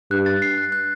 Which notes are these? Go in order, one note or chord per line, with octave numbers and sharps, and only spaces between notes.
G2 F#6
A6
C7
F#6
F#6